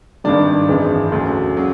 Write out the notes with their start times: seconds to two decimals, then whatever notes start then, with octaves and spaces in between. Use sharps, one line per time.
0.24 G#1 G2 D#3 G3 D4 D5
0.68 G#1 F#2 C#3 E3 G#3
1.12 D2 C#3 F#3
1.56 C#3 F#3